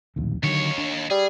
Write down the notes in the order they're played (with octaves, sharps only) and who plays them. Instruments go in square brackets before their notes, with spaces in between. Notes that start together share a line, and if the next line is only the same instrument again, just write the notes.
[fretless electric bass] D1 A#1 D#2
[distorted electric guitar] D#2 C#5 [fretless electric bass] D3 D#3 F#3
[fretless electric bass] D4
[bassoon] G3 [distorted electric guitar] G#4